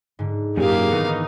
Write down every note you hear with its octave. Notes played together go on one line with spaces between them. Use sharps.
G#2 D3
F#2 A#2 A#3 G4 G#4 F5
D#3 E3 B3 C#4 D#4